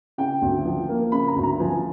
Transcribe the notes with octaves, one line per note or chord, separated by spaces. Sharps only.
C#3 G5
D2
F3
A#3
C#3 B5
A#5
D2
A#5
F3 G#5